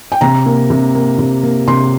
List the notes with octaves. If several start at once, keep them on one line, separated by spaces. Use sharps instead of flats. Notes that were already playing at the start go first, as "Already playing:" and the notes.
G5
C3 A#5
A#3
C3
A#3
C3
A#3
C3 C6